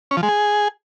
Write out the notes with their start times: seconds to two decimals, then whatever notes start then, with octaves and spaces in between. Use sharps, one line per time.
0.11 C#4
0.17 F3
0.23 G#3
0.29 G#4